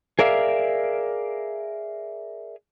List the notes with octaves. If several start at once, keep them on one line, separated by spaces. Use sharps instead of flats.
G#4 A#4 D5 E5 F5